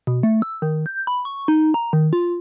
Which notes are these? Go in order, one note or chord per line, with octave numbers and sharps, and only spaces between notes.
B2
A3
E6
D#3
G6
B5
C#6
D#4
A#5
D#3
F4